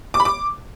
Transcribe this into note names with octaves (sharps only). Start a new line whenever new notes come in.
D6
B5
D6